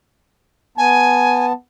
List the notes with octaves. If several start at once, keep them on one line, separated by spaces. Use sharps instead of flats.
B3 G#5 A5